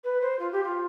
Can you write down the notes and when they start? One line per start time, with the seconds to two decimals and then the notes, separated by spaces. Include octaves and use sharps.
0.04 B4
0.21 C5
0.39 F4
0.52 G4
0.64 F4